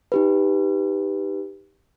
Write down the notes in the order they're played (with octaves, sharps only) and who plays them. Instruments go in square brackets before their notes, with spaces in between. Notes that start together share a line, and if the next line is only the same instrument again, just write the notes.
[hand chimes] D#4 G4 B4